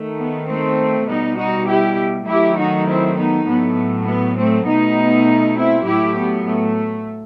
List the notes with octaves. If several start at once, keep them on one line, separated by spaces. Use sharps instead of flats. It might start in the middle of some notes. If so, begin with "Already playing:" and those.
Already playing: D#3 A3
B3
A3 C4
B2 G3 B3 D#4
D#4 F#4
E4 G4
D#3 F#3 A3 E4 G4
D#4 F#4
C4 E4
B3 D#4
A2 F#3 A3 B3
B3
A3 C4
B2 A3 B3 D#4
C4 E4
A2 F#3 A3 E4 G4
B3
A3